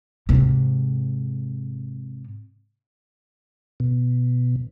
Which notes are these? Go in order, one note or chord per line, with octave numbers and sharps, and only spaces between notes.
G#2 C3
B2